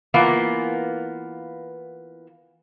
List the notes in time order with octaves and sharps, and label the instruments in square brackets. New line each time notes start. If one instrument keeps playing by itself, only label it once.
[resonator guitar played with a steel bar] E3 A#3 B3 F4